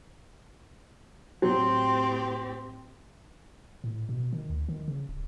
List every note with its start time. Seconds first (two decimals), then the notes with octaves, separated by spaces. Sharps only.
1.42 A2 F#3 C4 G4
3.84 A2
4.09 B2
4.33 D#3
4.50 D2
4.68 D#3
4.88 C#3
5.09 D1